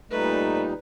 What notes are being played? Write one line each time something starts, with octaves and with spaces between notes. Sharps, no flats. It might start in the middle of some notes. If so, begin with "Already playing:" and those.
A#2 G3 A3 D#4 B4